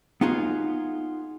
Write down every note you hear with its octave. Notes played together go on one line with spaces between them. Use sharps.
B3 D#4 F4 F#4 G#4